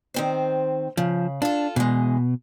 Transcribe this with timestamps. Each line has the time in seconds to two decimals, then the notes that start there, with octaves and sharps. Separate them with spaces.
0.14 D#3 C4 C5
0.97 C#3 F3
1.42 D4 F4 A4
1.76 B2 E3 G#3